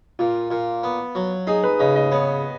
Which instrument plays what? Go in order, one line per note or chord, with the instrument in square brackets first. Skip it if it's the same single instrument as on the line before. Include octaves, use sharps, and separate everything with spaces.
[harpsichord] A#2 [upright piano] F4
[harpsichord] A#2
B3
F#3
[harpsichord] D#4 [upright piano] G#4
[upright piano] B4
[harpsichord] C#3 [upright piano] D#5
[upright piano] D#5
[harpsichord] B3 [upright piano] C#5